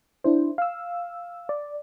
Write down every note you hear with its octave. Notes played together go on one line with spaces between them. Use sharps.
D4 E4 C5
F5 E6
D5